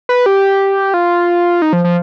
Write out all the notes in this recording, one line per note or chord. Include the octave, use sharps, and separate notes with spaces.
B4
G4
F4
D#4
F3
F3